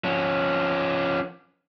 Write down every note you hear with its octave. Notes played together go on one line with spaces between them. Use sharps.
F3 C#4